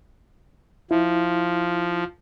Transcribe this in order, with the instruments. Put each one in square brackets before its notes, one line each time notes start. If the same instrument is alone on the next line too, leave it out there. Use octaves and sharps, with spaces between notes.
[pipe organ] F3 [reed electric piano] E4